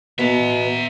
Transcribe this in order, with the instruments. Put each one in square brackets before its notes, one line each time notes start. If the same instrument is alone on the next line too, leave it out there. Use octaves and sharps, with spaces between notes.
[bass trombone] B2 [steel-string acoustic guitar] B3 [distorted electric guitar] E5 A#5